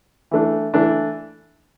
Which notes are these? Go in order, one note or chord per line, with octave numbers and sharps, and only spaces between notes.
E3 A3 D4
E3 A3 D4